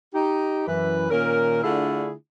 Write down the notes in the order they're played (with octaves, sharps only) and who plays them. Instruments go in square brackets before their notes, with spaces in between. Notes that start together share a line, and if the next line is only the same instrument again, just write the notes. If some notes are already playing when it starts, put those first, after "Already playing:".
[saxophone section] D#4 G4
F#2 E3 B4
A#2 D#3 C#4 A#4
D3 A3 D4 E4 F4 G#4